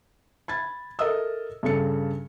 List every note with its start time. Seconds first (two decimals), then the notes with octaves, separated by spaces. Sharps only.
0.48 B5 G#6 A6
0.99 A4 A#4 D#5 E5 D#6 E6
1.63 G2 C#3 A4 C#7